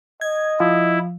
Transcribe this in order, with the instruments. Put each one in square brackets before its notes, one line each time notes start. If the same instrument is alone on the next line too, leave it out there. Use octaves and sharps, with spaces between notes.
[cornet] D#5 [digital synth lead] G#6
[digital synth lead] F3 [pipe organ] E4